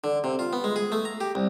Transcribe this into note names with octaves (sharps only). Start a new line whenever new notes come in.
D3
C3
F4
B3
G#3
G#4
A3
A#5
G4
C2